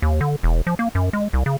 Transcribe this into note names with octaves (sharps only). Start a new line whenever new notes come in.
D#2
D3
E1
F3
A#3
F#2
G#3
C2
C#3